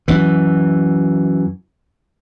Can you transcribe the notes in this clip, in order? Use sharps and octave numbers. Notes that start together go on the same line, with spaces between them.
F#2 E3